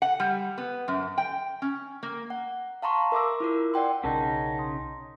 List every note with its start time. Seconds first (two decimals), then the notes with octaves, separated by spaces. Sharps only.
0.02 F#5
0.20 G3
0.58 B3
0.88 F#2
1.18 G5
1.62 C#4
2.03 A#3
2.30 F#5
2.82 F5 A5 A#5 C6 C#6
3.12 A#4 E5 D6 E6
3.40 E4 F4 A#4
3.74 D5 F#5 G5 C6
4.04 B1 C#3 C#4 D#4 A#4 F#5 A5
4.59 C6 D#6